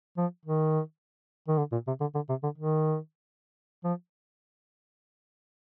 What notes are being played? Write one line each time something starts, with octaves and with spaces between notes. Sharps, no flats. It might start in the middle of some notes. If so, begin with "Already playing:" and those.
F3
D#3
D#3
D3
A#2
C3
D3
D3
C3
D3
D#3
F3